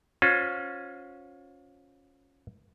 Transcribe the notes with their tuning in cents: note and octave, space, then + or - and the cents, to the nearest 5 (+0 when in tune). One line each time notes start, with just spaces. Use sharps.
C#4 +0 F4 +35 C5 +0